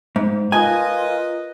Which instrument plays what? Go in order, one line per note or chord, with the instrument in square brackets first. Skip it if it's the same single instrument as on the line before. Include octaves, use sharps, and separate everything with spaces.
[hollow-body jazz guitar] G#2
[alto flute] F4 [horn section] A#4 B4 D#5 [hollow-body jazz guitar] G#5